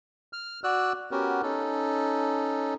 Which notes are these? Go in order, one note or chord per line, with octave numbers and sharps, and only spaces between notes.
F6
F#4 D5 E6 F#6
B3 C#4 F#4 G4 A#4
C#4 D#4 A4